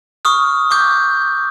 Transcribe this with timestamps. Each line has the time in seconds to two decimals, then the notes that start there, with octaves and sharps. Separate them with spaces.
0.25 C#6 D#6 F6
0.71 C#6 D6 G6